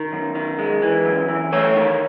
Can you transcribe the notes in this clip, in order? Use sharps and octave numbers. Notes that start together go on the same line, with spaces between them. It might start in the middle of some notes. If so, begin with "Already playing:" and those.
Already playing: D#3
F#2
D#3
G#3
E3
F#2
E3
A3 C#5
D#3